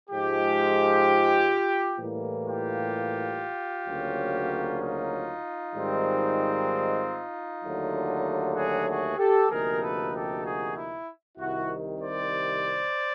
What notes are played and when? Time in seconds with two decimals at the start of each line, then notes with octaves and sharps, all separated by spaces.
0.10 G#2 F3 G#3 F4 G4
1.98 A2 E3 G3 A#3
2.45 F4 G4
3.87 D2 C#3 F#3 A#3 C#4
4.80 D#4 F4
5.74 G#2 D#3 G3 C4
7.62 D#2 D3 F#3 A3
8.55 F#4 G#4
8.88 F#4 G#4
9.18 G4 A4
9.49 D2 C3 F3 A#3 D#4 G#4 A#4
9.81 A4 B4
10.12 G4 A4
10.43 F#4 G#4
10.76 E4
11.38 C2 C3 D#3 E4 F#4
12.01 C5 D5